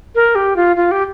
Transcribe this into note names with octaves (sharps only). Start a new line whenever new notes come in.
A#4
G4
F4
F4
G4